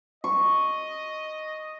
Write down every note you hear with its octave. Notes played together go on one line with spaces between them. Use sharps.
D#5 C#6